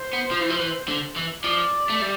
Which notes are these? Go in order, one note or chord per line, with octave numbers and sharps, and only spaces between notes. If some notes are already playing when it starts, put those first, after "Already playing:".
Already playing: C5
B3
F3
E3
F3
E3
D3
E3
F3 D5
A3
G3